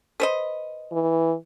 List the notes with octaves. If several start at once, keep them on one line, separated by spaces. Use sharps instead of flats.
B4 C5 D#5
E3